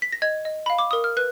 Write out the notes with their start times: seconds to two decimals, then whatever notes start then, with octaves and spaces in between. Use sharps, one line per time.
0.02 B6
0.12 A#6
0.22 D#5 G#6
0.45 D#5
0.66 F5 B5
0.78 D6
0.91 A#4 D#6
1.04 F6
1.17 B4 F#6